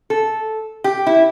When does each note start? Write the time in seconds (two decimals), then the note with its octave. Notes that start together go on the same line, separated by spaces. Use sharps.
0.10 A4
0.84 G4
1.06 E4